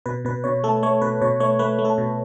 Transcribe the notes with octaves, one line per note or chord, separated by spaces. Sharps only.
B2 B4
B2 B4
B2 C#5
A3 A4
A3 C#5
B2 B4
B2 C#5
A3 C#5
A3 B4
A3
A4
B2